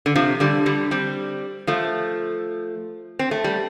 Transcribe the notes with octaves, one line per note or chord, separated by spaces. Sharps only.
D3
C3 F3
D3 G3
D3 G3
G3 C4
F3 A3
C4
A3
G3